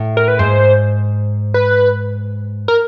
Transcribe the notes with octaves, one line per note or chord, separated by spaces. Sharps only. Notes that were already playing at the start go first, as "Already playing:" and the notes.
Already playing: A2
A#4
B4
G#2 C5
B4
A#4